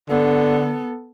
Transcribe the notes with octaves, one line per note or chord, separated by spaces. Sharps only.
D3 B3 A4